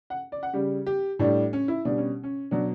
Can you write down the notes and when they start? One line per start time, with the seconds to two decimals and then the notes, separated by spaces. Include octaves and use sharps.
0.10 F#5
0.32 D5
0.43 F#5
0.53 C#3 G3 G4
0.86 G4
1.19 A2 G3 D4
1.53 C#4
1.68 E4
1.85 B2 G3 D4
1.98 C#4
2.23 C#4
2.51 B2 F#3 D4